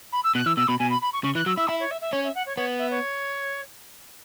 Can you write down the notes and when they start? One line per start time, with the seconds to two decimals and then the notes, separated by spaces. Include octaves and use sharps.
0.12 B5
0.24 E6
0.35 B2 F#6
0.46 E3 E6
0.57 B2 E6
0.68 B2 B5
0.79 B2 G#5
0.90 B5
1.02 B5
1.13 C#6
1.23 C#3 C#6
1.35 E3 F#6
1.46 F#3 E6
1.58 E4 E6
1.68 E4 E5
1.80 C#5
1.91 E5
2.01 E5
2.12 C#4 C#5
2.24 E5
2.35 F#5
2.46 C#5
2.57 B3 C#5
2.79 E5
2.91 C#5